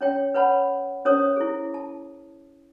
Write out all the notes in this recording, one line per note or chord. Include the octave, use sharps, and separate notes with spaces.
C#4 C#5 G5
B4 C#5 F#5 A5 B5
C#4 A#4 C5 C#5 D#6
E4 G#4
A5